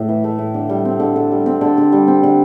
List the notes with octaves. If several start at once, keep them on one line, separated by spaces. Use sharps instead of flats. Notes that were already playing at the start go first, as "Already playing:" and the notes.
Already playing: A2
E3
A3
A2
D3
G3
C4
D3
D3
G3
C4
D3
D3
G3
C4
D3